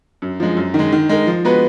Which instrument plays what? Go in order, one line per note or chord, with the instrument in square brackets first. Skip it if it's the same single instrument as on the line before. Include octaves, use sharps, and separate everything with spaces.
[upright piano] F#2
F3 G#3
F#2
D#3 G#3
D#3
G#3 D#4 A#4
F3
G#3 B3 F#4 B4